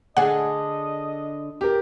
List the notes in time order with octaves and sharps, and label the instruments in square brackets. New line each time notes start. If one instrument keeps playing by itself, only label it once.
[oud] D3 D4 G#4 [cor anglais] D#5 [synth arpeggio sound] F#5
[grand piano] G4 A#4